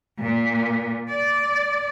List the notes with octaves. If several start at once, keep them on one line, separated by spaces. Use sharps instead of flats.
A#2
D5